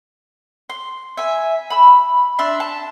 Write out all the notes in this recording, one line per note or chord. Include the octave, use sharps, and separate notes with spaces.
C6
E5 G#5
B5 E6
D4 E5 C6
A5